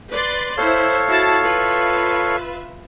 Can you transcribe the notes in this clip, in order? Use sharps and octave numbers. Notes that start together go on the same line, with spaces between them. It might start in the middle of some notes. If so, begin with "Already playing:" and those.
B4 D5 C6
E4 A4 C5 C#5 F5
E4 F#4 A5
F4 B4 E5